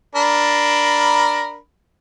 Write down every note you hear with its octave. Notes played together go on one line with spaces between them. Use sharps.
D4 A#4 B5